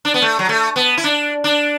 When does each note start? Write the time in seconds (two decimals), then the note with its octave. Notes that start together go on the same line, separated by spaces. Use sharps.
0.05 D4
0.14 B3
0.22 A3
0.39 F#3
0.49 A3
0.76 B3
0.97 E4
1.04 D4
1.44 D4